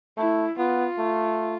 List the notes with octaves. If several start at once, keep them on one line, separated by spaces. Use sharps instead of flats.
A3 E4
B3 F4
A3